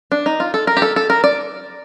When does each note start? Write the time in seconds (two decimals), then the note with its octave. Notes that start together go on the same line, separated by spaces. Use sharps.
0.12 D4
0.26 D#4
0.40 F4
0.54 A4
0.67 A#4
0.77 G4
0.82 A4
0.96 A4
1.10 A#4
1.24 D5